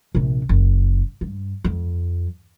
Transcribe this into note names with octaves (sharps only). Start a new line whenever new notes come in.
A#1 C3
F#1
G2
F2